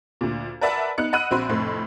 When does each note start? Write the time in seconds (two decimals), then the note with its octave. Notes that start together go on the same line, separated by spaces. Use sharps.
0.21 D2 A#2
0.61 A#4 B4 D5 E5 F#5 A5
0.98 B3 D#4 F#6 C#7
1.13 D#5 F#5 B5 E6 F#6 D#7
1.31 A#1 C4 F#4 B5 C6
1.49 F1 F2 A2 C4 C6